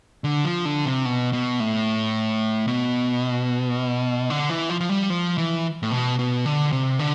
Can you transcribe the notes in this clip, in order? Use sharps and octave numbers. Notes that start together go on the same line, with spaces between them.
D3
F3
D3
C3
B2
B2
A2
B2
D3
E3
F3
F3
G3
F3
E3
A2
B2
B2
D3
C3
D3